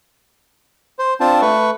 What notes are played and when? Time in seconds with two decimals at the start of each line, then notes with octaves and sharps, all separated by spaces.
0.99 C5
1.20 C4 D4 F4 C5 A5
1.42 A3 B4 C#6